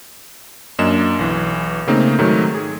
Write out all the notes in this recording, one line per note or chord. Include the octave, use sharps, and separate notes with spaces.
F#2 A#3 D4 D#5 E7
B1 E3
C#3 A3 A#3 C4 D#4
G#2 D#3 F#3 A3
G#4